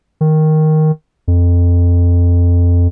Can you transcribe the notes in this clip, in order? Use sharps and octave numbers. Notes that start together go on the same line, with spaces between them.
D#3
F2